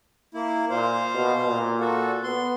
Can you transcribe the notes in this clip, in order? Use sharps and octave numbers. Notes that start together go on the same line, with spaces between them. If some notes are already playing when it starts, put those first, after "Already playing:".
A#3 E4
A#2 C5 F5
B2
A#2
F#4 A4
B3 C6